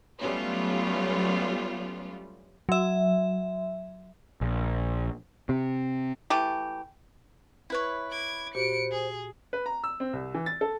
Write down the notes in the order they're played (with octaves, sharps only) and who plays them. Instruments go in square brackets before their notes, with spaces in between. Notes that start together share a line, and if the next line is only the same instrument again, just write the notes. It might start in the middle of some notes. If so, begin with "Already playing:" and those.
[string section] F#3 G3 A3 B3 C#4 F4
[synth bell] F#3 E5
[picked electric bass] A#1
C3
[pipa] E3 A3 G4
[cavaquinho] E4 B4 C#5
[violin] D6 G#6
[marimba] A#2 F#4 G4 [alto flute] C5 [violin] C#7 D7
[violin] G#4
[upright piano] B4
A#5
E6
C4
C2
E3
A6
A4